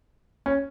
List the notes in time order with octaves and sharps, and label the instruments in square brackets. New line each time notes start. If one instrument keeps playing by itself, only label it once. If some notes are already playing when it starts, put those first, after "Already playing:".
[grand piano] C#4